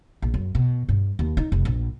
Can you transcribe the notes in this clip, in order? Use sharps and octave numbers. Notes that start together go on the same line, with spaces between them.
A#1
F#2
B2
G2
D#2
D#4
F1
A#1